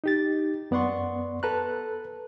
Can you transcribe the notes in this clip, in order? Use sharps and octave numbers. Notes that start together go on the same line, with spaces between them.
D#4 G4 A6
F#2 B3 D5 F#5 C6 C#6
A4 B4 A5 A#5 F#6